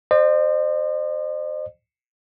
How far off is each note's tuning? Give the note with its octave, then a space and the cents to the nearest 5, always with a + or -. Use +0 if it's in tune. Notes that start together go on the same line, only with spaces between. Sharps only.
C5 +0 D#5 -45